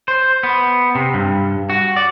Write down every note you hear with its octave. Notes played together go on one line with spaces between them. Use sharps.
C5
B3
C3
G2
F#4
D5